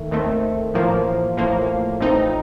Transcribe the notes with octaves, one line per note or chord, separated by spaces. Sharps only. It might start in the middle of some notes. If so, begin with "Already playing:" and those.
Already playing: D#2 D#3 A3
D#2 D#3 A3 C4
A1 A2 F3 A#3
A1 A2 F3 A#3
A1 A2 F3 C4 D#4